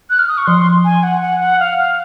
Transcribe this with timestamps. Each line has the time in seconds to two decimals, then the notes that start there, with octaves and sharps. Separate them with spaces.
0.10 F#6
0.19 F6
0.28 D#6
0.38 C#6
0.47 F3 C6
0.85 G#5
1.03 F#5
1.22 F#5
1.40 F#5
1.60 F5
1.78 F5